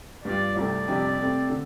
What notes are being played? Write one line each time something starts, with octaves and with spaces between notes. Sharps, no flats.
G2 G3 F4 D5
C2 C3 A3 C4 D5
F2 C3 G3 D4 G4
C3 A3 C4
D3